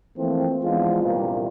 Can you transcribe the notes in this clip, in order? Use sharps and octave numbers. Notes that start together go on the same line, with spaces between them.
E3 F3 A3 A#3 C4
E3 F3 G#3 B3 D4 F4
C2 G2 A#2